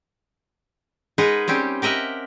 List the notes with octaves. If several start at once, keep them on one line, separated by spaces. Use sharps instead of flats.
G#3 D#4 G#4 A#4 B4 F#5
G3 C4 C#4 G4
G4 A#4 D#5 E5 F#5